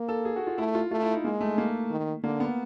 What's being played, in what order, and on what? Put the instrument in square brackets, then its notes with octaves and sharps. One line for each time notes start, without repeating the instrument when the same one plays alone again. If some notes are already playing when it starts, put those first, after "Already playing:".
Already playing: [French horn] A#3
[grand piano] A4
G#4
F#4
F4
[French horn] A3 [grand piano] E4
[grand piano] F4
[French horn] A3 [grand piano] F4
[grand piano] E4
D#4
[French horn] G#3 [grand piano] A#3
[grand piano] A3
A#3
[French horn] D#3
[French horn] D3 [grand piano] A#3
[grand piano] B3